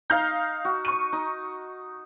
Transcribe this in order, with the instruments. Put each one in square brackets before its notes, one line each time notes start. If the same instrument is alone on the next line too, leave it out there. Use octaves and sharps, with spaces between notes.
[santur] D#4 [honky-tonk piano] F5 F6 G6
[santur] F#4
[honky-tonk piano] C#6 D#7
[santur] D#4